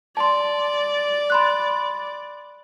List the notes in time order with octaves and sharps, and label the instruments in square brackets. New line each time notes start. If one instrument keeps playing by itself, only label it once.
[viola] D5 [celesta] A5 C6
[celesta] B5 C6 F#6